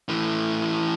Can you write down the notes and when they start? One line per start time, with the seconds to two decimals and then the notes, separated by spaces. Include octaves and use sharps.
0.08 A2 E3